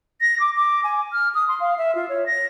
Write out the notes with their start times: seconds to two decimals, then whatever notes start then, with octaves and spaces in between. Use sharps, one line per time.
0.21 A#6
0.40 D6
0.56 D6
0.84 G#5
1.12 F6
1.35 D#6
1.48 C6
1.60 F5
1.78 E5
1.95 F4
2.09 C#5
2.26 A#6